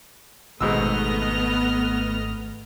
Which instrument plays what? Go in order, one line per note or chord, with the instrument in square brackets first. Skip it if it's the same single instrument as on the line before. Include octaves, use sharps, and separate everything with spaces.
[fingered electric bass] G#1 [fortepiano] G#2 B2 E6 [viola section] A3 B3 [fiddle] D#5 F6